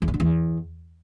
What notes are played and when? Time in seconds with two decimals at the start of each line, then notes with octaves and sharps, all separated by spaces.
0.02 E2
0.08 D#3
0.14 D3
0.20 E2